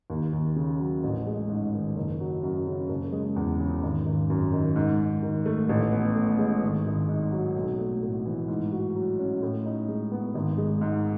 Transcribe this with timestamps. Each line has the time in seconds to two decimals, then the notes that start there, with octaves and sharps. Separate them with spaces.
0.10 D#2
0.33 D#2
0.56 C#3
0.79 F#3
1.04 A1
1.27 G#3
1.49 G#2
1.74 D#3
1.96 F#1
2.20 F#3
2.43 F#2
2.67 C#3
2.89 F#1
3.12 G#3
3.36 E2
3.60 C#3
3.83 G#1
4.06 G#1
4.30 F#2
4.52 D#3
4.76 G#2
4.99 G#2
5.23 D#3
5.46 A3
5.69 A1
5.93 B3
6.16 A2
6.38 G#3
6.62 G#1
6.85 G#1
7.09 G#2
7.32 F#3
7.56 B1
7.78 A3
8.03 A2
8.25 E3
8.48 G#2
8.72 F#4
8.95 F#3
9.19 C#4
9.42 A2
9.65 D#4
9.88 G#3
10.12 B3
10.34 G#1
10.58 G#3
10.81 G#2